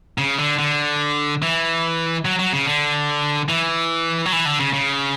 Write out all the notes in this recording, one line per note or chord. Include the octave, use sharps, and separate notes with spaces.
C#3
D3
D3
E3
F#3
F#3
C#3
D3
E3
F#3
E3
D3
C#3
C#3